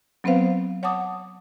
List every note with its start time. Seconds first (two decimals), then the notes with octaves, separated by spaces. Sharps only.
0.24 F#3 B3 C4 B4 C5 F5
0.83 C#5 F#5 A5 D6 D#6